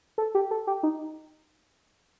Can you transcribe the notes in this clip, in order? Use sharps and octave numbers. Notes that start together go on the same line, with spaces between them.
A4
G4
A4
G4
D#4